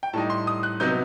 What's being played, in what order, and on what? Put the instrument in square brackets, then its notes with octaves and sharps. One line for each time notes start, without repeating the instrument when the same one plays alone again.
[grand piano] G5
A2 G3 D#4 A5
C6
D#6
F#6
C3 F#3 B3 D#4 G6